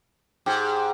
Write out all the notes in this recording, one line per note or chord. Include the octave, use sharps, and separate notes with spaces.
G#2 G4